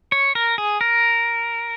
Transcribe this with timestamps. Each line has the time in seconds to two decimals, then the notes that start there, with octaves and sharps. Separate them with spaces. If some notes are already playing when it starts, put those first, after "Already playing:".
0.12 C#5
0.35 A#4
0.58 G#4
0.81 A#4